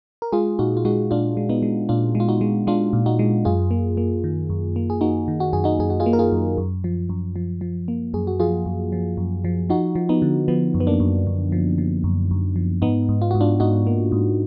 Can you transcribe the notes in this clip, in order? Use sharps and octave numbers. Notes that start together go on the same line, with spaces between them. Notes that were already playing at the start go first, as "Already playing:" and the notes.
A#4
G#3 F4 G#4
A#2 D#4 F#4
F4
G#3 D#4 F#4
A#2 D4 F4
G#3
B3 D#4
G#3
A#2 D4 F4
G#3
F4
D#4 F#4
G#3
G#3 D4 F4
A#2
D#4 F#4
G#3
F#2 F4 G#4
A#3
A#3
D#3
F#2
A#3
G#4
A#3 D#4 F#4
D#3
F#4
F#2 G#4
D#4 F#4
F#2 G#4
F#4
F4 G#4
A#3
A#4
F4 G#4
F#2
F#2
F3
F#2
F3
F3
A#3
F#2 G#4
F#4
F3 F4 G#4
F#2
F3
F#2
F3
F3 D#4 F#4
F3
B3 D#4
D3
F3 B3
F#2
B3
A#3 D4
F#2
F#2
F3
F3
F#2
F#2
F3
G#2 B3 D#4
G#2
F4
G#2 F#4
D4 F4
G#2 D#4 F#4
A#3
G#2